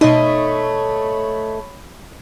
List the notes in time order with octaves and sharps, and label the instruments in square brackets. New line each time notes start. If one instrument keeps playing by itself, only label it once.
[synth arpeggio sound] B2 D#4 [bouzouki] A3 D#5 [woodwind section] C#5 B5